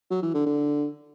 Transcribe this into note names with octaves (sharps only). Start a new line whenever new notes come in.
F#3
E3
D3
D3